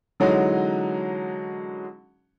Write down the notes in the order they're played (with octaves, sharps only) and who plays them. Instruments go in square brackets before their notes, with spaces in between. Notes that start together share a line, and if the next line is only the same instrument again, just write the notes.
[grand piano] D3 E3 F#3 G#3 C#4 D#4